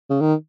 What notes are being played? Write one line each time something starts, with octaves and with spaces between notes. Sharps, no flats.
C#3
D#3